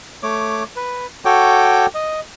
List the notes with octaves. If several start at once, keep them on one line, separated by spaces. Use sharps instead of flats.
A3 C#5 D6
B4
F#4 A4 C#5 G5 D6
D#5